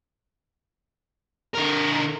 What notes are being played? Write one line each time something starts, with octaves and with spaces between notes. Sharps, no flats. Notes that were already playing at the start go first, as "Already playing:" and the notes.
D3 A#4